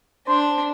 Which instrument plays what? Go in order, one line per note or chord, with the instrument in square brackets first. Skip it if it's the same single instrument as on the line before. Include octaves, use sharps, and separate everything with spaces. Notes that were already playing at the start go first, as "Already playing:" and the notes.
[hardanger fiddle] D4 [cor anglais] C5